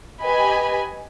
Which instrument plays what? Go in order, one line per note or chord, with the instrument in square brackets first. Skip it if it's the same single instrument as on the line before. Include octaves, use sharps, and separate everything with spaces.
[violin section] G4 B4 D#5 G#5 B5